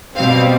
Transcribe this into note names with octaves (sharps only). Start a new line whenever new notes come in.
B2 G3 C4 F5